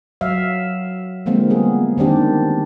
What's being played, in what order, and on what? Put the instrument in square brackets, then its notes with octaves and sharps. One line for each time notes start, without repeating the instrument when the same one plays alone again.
[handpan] F#3 E5 F5
D3 F3 G#3 A#3 C4
G3 B3 G#4
D#3 C4 D4 G4